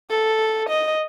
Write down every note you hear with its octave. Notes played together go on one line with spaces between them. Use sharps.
A4
D#5